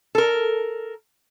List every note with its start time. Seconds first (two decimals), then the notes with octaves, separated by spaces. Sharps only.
0.15 A4 A#4